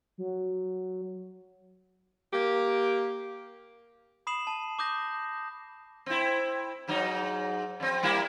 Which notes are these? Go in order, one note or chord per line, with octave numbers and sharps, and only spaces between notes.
F#3
A#3 G4
B5 D#6 C7 E7 F#7
A5
D6 D#6 G6 A#6
C4 E4
G#2 F#3 D#4
F2 C4
G3 A#3 E4